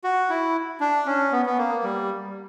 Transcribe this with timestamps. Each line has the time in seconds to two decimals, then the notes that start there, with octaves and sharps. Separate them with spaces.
0.04 F#4
0.30 E4
0.80 D4
1.06 C#4
1.32 B3
1.46 B3
1.58 A#3
1.83 G3